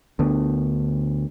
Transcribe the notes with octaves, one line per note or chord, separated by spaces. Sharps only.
D2 D3 B3